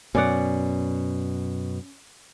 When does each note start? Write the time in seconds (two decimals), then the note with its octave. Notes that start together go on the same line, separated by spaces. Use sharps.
0.15 F#2 B2 C#4 D5 F#5